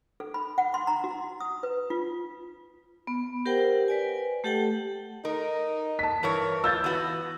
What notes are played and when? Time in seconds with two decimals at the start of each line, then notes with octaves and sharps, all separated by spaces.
0.20 A4
0.34 B5
0.58 F#5
0.74 C6
0.87 A#5
1.04 F#4
1.41 D#6
1.63 B4
1.90 F4
3.07 B3
3.46 G4 A#4 C5 F#5 G5
3.88 B4 D5 G#5
4.44 A3 G4 A4 F#5 G5 A5
5.25 D#4 A#4
5.99 A5 B6
6.23 G2 E3 A#4 C#5
6.64 F4 E6 G6 A6
6.84 B3 F#4